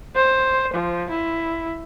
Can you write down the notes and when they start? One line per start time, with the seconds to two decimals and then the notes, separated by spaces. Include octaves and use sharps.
0.16 C5
0.74 F3
1.10 E4